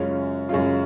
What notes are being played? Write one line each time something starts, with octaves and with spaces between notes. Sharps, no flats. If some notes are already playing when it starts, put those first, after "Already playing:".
Already playing: F#2 C#3 G#3 C#4 F4
F#2 C#3 G#3 C#4 F4